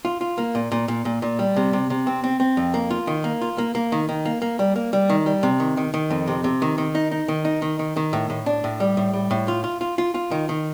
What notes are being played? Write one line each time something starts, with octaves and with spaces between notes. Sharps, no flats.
F4
F4
A#3
A#2
A#2
A#2
A#2
A#2
G3
C3
C3
C3
C4
C4
C4
F2
A#3
F4
D#3
A#3
F4
A#3
A#3
D#3
D#3
A#3
A#3
G3
A#3
G3
D#3
G3
C3
D#3
D#3
D#3
F2
C3
C3
D#3
D#3
D#4
D#4
D#3
D#4
D#3
D#3
D#3
A2
A2
D4
A2
G3
A2
G3
A2
F4
F4
F4
F4
F4
D#3
D#3